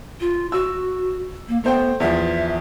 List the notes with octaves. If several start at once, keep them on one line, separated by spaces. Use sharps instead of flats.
F4
F#4 E6
A#3
A3 B3 C5 G5
E2 F3 E5